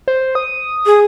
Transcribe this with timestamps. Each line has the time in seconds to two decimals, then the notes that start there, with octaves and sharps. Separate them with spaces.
0.08 C5
0.35 D#6
0.86 G#4